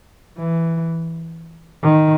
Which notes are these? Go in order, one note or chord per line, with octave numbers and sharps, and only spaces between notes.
E3
D#3